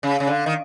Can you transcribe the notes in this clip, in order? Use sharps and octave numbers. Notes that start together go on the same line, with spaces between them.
C#3
C#3
D3
D#3